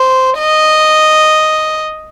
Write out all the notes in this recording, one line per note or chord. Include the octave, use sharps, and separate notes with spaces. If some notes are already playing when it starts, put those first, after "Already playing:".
Already playing: C5
D#5